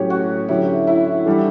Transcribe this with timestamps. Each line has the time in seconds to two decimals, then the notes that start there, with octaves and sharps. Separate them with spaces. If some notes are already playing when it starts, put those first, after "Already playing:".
Already playing: A2 F#3 C#4 G4 C#5
0.10 F#4
0.49 D3 F#3 C#4 E4 G4
0.87 E4
1.26 E3 G3 D4 A4